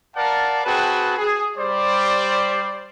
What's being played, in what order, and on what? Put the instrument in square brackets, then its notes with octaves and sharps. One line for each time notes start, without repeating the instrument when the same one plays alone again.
[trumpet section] A#4 D5 F5 F#5 A5
C4 F#4 G#4 B4 G5 A5
G#4
G3 C5 D5